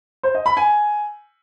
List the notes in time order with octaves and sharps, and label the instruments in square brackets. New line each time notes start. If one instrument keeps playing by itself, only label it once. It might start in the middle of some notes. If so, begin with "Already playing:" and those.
[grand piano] C5
D#5
B5
G#5